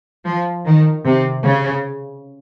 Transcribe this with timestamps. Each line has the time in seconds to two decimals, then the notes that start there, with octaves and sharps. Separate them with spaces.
0.25 F3
0.66 D#3
1.05 C3
1.44 C#3